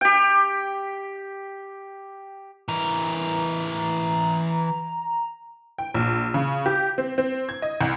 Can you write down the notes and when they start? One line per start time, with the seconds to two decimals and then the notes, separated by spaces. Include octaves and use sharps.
0.01 G4 G5
2.69 E3 A#4 A#5
5.78 G5
5.94 A#1
6.34 C#3
6.66 G4
6.98 C4
7.18 C4
7.49 G#6
7.62 D#5
7.81 C2